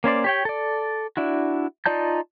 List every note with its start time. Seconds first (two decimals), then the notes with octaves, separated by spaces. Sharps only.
0.04 A#3 C#4 C5 D5
0.24 G4 C#5 G5
0.45 A4 D5
1.17 D4 E4 F#4
1.86 D#4 F4 D5 A5 G6